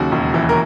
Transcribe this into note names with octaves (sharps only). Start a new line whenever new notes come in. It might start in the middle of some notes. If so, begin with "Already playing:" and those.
Already playing: D#2 C#3 F#3 F#4
E1
E3
A#4